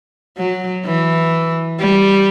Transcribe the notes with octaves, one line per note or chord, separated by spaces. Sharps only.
F#3
E3
G3